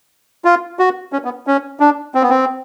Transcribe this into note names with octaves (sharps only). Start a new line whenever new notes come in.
F4
F#4
C#4
B3
C#4
D4
C4
B3
C4